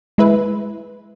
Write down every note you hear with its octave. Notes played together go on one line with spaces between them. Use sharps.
G#3 E4 B4